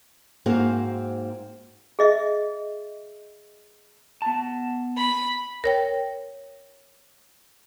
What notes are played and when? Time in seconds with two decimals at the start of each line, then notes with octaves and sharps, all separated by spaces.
0.46 G#2 A#3 C4 F#4 C5 F5
1.99 G#4 D#5 E5
4.22 B3 A5
4.97 B5
5.64 A#4 C#5 G5